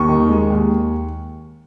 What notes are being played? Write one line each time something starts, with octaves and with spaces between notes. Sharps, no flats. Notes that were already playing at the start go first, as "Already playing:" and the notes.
Already playing: D#2 C#6
D#3
G#3
D#2